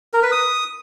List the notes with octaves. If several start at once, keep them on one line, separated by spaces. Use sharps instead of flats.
A#4
B4
D#6